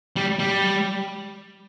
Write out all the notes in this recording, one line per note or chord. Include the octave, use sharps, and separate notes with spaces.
G3
G3